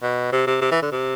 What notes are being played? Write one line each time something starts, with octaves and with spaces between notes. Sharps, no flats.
B2
C3
C3
C3
E3
D3
C3